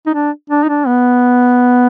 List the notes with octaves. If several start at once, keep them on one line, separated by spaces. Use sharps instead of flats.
D#4
D4
D4
D#4
D4
B3